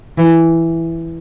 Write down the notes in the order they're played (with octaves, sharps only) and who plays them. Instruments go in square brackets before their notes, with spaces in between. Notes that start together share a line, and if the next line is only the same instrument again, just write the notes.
[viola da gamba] E3